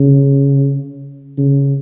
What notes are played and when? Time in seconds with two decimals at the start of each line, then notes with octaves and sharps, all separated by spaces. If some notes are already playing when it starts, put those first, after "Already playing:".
Already playing: C#3
1.38 C#3